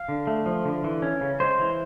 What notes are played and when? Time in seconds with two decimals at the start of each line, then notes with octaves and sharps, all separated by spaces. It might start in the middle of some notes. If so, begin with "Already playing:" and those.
Already playing: F5
0.08 D3
0.27 A3
0.46 F3
0.65 D3
0.84 E3
1.02 C#4
1.21 C#3
1.40 G#3 C5
1.60 E3